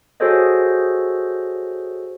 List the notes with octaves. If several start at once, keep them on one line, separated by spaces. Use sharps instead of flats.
F#4 G#4 A4 C5 C#5 D#5